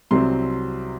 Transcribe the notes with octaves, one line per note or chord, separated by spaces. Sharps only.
C2 C3 F#3 C4 C6